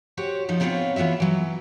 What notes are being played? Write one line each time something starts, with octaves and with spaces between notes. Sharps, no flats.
F#4 G4 C5 C#5
F3 D#4 F4
G#2 B3 C4 F4 C#5 F5
E3 B3 F4 F#4 E5
E3 F#3